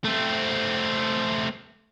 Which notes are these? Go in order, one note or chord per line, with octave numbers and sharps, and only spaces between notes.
A3 C4